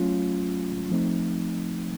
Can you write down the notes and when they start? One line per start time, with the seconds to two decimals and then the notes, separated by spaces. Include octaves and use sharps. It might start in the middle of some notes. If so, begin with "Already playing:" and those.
Already playing: F#3 A3 C#4 F4
0.90 F3 A3 C4 D#4